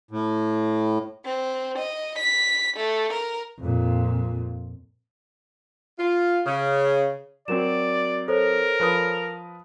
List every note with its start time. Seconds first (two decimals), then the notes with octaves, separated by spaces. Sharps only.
0.11 A2
1.25 C4
1.78 D#5
2.18 B6
2.77 A3
3.13 A#4
3.59 F2 A#2
5.99 F4
6.46 C#3
7.48 F#3 C4 F#4 A#4 D5 E7
8.28 A4 A#4 C5 C#5
8.80 F3 B4 D#6